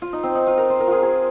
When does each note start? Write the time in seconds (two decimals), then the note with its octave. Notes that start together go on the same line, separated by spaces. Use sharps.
0.02 F4
0.13 D#4
0.23 C4
0.35 D#4
0.47 F4
0.57 A#4
0.70 C5
0.80 A#4
0.87 F4 G#4
1.03 G#4